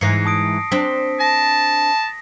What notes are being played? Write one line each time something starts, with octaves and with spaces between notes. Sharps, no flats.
G#2 E3 A#6 C7 C#7
A5 D#6 D7
C4 D4 B6
A5 A#6